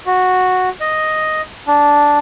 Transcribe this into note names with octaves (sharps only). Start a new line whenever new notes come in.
F#4
D#5
D4